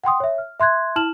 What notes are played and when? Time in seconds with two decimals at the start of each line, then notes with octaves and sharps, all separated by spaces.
0.04 F#5 G5 C6 D#6
0.20 C#5 E5
0.38 F6
0.60 E5 C6 F#6 G#6
0.96 E4 A5 F6 E7 F#7